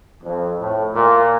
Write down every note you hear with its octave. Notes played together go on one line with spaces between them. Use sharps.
F2
A2
A#2